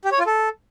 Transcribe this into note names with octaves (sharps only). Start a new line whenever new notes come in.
G4
C#5
F4
A4